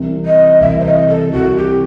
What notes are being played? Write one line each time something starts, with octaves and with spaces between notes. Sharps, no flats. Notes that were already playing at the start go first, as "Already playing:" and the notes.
Already playing: C2 C3 E3
D#5
C2 C3 E3 E5
C5
D#5
A4
C2 C3 E3 F#4
G4